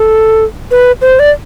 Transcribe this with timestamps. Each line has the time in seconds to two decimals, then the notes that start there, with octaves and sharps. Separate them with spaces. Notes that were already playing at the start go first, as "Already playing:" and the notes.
Already playing: A4
0.71 B4
1.02 C5
1.19 D5